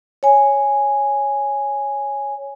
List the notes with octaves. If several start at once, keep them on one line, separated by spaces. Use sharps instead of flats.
C#5 G#5